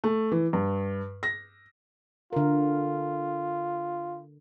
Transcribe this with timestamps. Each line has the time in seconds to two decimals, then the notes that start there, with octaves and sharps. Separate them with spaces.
0.04 A3
0.32 E3
0.53 G2
1.23 A#6
2.33 D3 F4 A#4